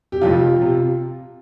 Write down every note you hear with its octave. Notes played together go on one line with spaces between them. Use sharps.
G4
F1 F2 C3 F4
C3